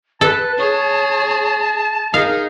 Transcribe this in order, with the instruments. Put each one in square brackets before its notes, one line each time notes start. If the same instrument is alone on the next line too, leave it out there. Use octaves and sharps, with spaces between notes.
[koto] A4 [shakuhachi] B4 [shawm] A5
[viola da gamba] G#4 [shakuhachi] C#5
[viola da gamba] D#4 G#4 [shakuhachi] A#4 [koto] F5